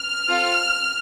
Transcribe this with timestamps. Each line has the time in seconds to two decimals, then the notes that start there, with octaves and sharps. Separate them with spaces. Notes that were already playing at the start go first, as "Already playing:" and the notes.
Already playing: F6
0.28 C4 F4 A4